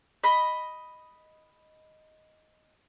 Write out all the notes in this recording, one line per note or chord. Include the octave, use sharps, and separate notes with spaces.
D#5 B5